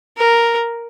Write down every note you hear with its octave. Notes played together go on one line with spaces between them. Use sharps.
A#4